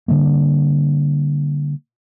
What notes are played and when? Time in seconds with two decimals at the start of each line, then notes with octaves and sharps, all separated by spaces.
0.08 D3 E3 G3 A#3